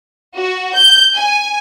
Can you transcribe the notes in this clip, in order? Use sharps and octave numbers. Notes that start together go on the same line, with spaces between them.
F#4
G6
G#5